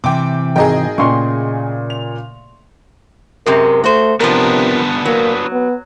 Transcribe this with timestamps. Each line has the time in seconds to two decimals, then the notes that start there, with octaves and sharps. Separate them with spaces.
0.04 C3 E3 G5 D6
0.56 G#1 G#4 D#5 G5 A#5
0.98 A#2 C#3 A3 C6 C#6
1.90 F7
3.46 F#2 C3 G#3 A#4
3.84 A3 F#4 C5
4.20 C3 F3 B3 D4 A#4
5.05 F#3 A#3
5.52 B3